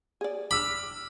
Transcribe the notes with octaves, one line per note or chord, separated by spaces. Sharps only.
G#4 D5
B5 D6 E6 F6